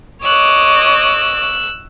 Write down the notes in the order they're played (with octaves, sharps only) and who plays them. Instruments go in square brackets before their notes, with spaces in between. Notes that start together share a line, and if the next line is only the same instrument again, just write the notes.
[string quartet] C#5 D#5 D6 [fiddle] E6 F#6